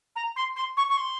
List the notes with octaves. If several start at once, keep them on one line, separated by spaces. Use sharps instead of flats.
A#5
C6
C6
C#6
C#6
C6